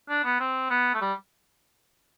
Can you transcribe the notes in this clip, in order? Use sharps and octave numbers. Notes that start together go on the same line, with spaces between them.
D4
B3
C4
B3
A3
G3